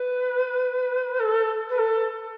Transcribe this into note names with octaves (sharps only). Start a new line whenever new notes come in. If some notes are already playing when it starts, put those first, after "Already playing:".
Already playing: B4
A4
B4
A4